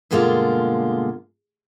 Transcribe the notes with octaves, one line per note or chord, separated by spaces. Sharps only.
G2 B2 D3 G#3 A#3 F4